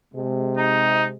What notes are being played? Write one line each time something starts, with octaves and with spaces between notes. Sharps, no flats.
C3 G#3
D#4